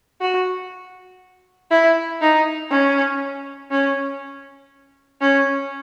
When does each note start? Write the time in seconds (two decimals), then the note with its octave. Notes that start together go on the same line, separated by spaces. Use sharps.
0.21 F#4
1.71 E4
2.21 D#4
2.71 C#4
3.71 C#4
5.21 C#4